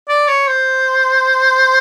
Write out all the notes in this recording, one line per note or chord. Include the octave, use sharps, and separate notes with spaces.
D5
C#5
C5